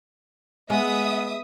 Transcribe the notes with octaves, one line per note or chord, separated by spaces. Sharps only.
G#3 B3 E5 D#6